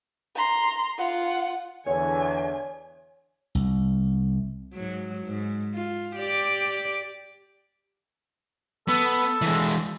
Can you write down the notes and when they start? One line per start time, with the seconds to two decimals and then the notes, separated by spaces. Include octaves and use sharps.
0.35 A#5 C6
0.98 F4 F#5
1.86 E2 D3 C#5 G#5
3.55 C2
4.74 G#2 F#3
5.26 G#2
5.74 F4
6.16 G4 D5
8.88 B3 A4
9.42 E3 G#3